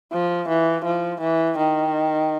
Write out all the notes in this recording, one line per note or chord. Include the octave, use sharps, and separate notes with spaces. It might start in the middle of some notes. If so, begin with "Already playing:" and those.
F3
E3
F3
E3
D#3